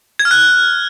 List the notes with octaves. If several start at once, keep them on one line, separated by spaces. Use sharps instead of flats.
G#6
F6
F#6